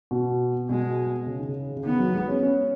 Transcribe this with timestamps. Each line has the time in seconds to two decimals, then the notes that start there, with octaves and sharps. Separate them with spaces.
0.11 B2
0.69 B2 G#3
1.27 C#3
1.38 D#3
1.49 C#3
1.77 C#3
1.85 D#3 B3
1.99 F#3
2.14 G#3
2.28 C#4
2.43 C#4